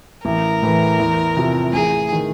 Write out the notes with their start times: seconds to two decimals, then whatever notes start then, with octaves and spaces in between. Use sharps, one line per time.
0.25 A1 A#4
0.63 A2 E3
0.99 E2
1.37 C3 F3
1.73 A1 G#4
2.12 D#3